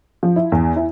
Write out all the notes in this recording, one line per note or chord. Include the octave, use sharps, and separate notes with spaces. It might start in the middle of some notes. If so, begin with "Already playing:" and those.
F3
E4
E2
E4